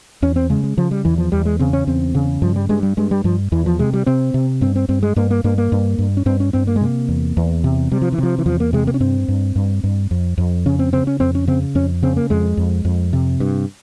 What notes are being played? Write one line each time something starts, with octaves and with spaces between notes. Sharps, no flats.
E2 C#4
C4
C#3 G#3
G#3
C#3 F3
G3
E2 E3
F3
E2 G3
G#3
C#3 C4
C#4
E2 C4
C#3
G2 F3
G3
G2 G#3
G3
G2 G#3
G3
G2 F3
E2 E3
F3
C3 G#3
G3
C3 C4
C3
G2 C4
C4
G2 C4
G#3
G2 A#3
A#3
G2 A#3
A#3
G2
G2
C#4
G2 C4
C#4
G2 C4
A#3
G#3
C3 A#3
E2
E2
C3
C3 G3
F3
E3
C3 F3
E3
E2 F3
A#3
C3 G#3
A#3
C#4
G2 C4
G2
G2
G2
F2
F2
C#3 C#4
C4
C#3 C4
C#4
F2 C4
C#4
C#3 C4
F2 C#4
C#3 C4
A#3
F2 G#3
F2
F2
C3
G2